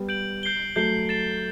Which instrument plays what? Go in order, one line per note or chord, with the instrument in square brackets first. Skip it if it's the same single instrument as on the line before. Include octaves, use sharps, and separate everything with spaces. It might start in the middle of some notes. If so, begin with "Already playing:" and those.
Already playing: [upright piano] G3 B3
[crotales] G6 D7 F#7
G6 C7 G7
[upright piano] F#3 A3 [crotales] G6 C7 G7
[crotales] A6 C7 E7